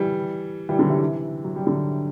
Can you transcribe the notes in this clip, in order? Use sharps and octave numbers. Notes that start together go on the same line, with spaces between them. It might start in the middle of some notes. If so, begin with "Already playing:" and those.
Already playing: E3 G3
E3 G3
D3 F#3
C3 E3
F#3
G3
D3 F#3